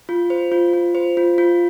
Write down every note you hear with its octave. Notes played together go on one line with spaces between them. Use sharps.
F4
C5
F4
F4
C5
F4
F4